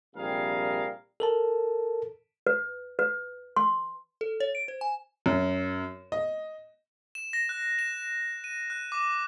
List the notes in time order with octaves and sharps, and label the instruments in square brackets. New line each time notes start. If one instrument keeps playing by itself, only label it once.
[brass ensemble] A#1 C3 G3 G#4 A#4 F5
[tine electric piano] A4 A#4 A5
[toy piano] B4
B4
C6
[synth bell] A4
C#5
D7
C5
G#5
[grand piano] F#2
D#5
[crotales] E7
A#6
F#6
E7
D#7
F#6
D6